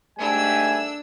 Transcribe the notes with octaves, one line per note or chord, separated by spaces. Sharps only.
G#2 G3 A3 D4 G#5 E6